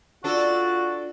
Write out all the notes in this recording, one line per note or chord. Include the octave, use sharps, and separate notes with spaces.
D4 F4 F#4 A4